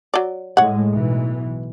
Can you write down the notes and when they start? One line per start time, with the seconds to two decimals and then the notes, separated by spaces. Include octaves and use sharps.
0.14 F#3 D5
0.57 A2 G#3 C#5 F#5
0.93 B1 E3